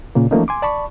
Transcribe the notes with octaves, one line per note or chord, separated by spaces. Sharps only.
A#2 C#3 A#3
E3 F3 A3 A#3 C#4 D#4
G#5 C6 D6
D5 A5 B5 C#6